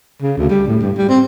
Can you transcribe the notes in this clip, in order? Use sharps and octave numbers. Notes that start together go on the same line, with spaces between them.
C#3
D2
G3
A2
G2
G3
C4